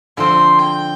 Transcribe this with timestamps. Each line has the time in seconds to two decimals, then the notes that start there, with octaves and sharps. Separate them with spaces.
0.17 D3 F3 C4 C6
0.59 G5